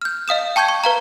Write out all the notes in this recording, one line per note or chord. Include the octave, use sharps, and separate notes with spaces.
F6 G6
D#5 F5 D#6 E7
G5 A5 C#6 G6 G#6
C#6
B4 F5 A#5